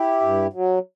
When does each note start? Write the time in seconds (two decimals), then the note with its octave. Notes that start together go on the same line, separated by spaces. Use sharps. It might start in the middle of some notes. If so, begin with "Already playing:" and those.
Already playing: E4 G4
0.21 G2
0.53 F#3